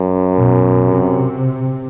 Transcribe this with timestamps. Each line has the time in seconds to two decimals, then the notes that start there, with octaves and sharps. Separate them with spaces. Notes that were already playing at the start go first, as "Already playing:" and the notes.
Already playing: F#2
0.36 B2
0.83 C3